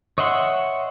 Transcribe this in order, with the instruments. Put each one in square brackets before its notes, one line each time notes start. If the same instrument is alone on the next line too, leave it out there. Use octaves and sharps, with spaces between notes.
[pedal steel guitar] C#5 D#5 E5 F#5 C6